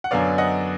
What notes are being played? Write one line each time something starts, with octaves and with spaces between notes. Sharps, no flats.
F#5
F#2 D3 F#3 B3 D5 F5
D#5 F#5